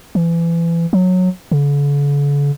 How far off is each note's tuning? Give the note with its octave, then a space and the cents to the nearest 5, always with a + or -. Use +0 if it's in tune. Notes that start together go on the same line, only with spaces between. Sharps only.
E3 +30
F#3 -15
D3 -45